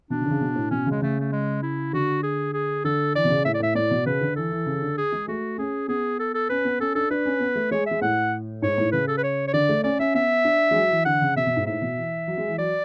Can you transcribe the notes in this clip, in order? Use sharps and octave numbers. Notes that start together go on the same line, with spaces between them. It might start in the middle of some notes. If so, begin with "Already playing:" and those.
B2 D4
C#3
D3
C#3
B2
A2
B2 C#4
C#3 G#3
C#3 A3
A3
G#3
E4
D3 F#4
G#4
G#4
D3 A4
E3 D5
B2
C#3
A2 E5
D5
A2 E5
A2 D5
B2
C#3 B4
D3
E3 A4
E3
C#3
D3
G#4
G#3
A3 F#4
C#4 G#4
B3 G#4
A4
A4
C#4 B4
B3
C#4 A4
D4 A4
D4 B4
C#4
B3
A3
G#3 C#5
G#3 E5
A2 F#5
G#2 C#5
A2
C#3 B4
A4
B4
C#5
C#5
D3 D5
A3
C#4 D5
C#4 E5
B3 E5
D4
G#3
F#3
E3
D3 F#5
C#3
B2 E5
B2
G#2
A2 E5
B2
E3
F#3
G#3
E3
F#3 D5